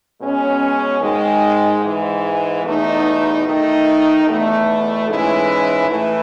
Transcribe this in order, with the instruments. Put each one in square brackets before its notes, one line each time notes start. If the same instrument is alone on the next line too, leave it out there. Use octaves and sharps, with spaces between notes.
[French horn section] B2 G#3 C#4
G#2 D#3 G#3
G#2 E3 G#3
E2 B2 A3 D#4
D#3 A3 D#4
E2 B2 A3
G#2 E3 G#3 C#4 E4
A2 E3 A3 E4